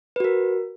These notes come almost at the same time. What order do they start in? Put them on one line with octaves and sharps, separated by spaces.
B4 F#4 A#4